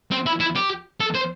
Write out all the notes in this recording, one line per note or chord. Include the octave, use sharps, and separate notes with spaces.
C4
E4
E4
G4
A4
C5